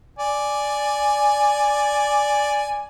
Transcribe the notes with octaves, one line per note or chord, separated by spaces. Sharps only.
D5 G#5